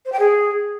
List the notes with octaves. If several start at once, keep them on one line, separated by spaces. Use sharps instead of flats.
C5
G5
G#4